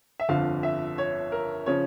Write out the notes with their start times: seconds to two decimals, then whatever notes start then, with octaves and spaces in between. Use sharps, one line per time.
0.20 E5
0.29 G1 F2 D3 F3 F5
0.63 E5
0.98 C#5
1.32 A#4
1.66 C#3 F3 C#5